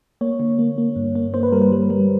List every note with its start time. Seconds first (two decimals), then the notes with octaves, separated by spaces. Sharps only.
0.21 A#3 C#5
0.40 D3
0.59 A#3
0.78 A#3
0.96 G2
1.15 A#3
1.34 A#3 C5
1.43 B4
1.52 G3 A#4
1.62 B4
1.72 G3
1.90 G3